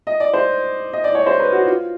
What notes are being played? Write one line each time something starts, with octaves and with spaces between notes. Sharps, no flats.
D#5
D5
C5
D#5
D5
C#5
C5
B4
F#4
F4